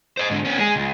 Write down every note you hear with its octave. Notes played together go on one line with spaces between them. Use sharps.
C5 D#5
G#2 D3
B3 C#4
G#3 G#4
C#2